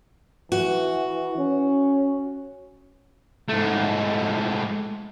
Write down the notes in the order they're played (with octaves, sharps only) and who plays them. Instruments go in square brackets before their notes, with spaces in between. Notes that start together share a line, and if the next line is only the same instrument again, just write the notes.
[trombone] E3 [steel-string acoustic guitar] F#4
[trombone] C#4
[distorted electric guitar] G#2 A3